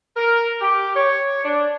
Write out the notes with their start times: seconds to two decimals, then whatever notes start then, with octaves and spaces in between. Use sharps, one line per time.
0.16 A#4
0.61 G4
0.95 C#5
1.44 D4